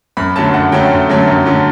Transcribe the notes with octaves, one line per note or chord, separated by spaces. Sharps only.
F#2 B5
D3 F#3 A3 C#4 A5
F#2 F#5
D3 F#3 A3 C#4 G5
F#2
D3 F#3 A3 C#4
F#2
D3 F#3 A3 C#4